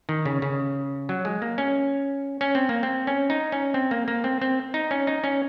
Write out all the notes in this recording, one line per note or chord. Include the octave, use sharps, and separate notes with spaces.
D#3
C#3
C#3
F#3
G#3
A#3
C#4
C#4
C4
A#3
C4
C#4
D#4
C#4
C4
A#3
A#3
C4
C4
D#4
C#4
D#4
C#4